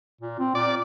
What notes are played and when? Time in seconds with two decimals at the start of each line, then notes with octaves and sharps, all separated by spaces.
0.21 A#2
0.39 C4
0.55 A#2 D5